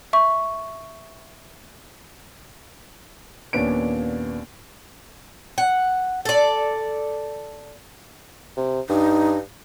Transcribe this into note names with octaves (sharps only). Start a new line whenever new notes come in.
E5 C#6
D#2 A#2 B3 C#4 D4 D7
F#5
A4 D5
C3
G2 D#4